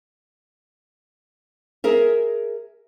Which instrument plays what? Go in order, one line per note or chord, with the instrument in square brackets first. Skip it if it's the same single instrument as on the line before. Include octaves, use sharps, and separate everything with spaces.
[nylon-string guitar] G#4 A#4 E5